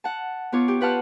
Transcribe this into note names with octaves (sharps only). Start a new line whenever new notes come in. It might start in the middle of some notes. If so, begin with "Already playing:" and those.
F#5 A5
B3 F4 C#5 D6
G4
F4 B4 F#5 A5 F6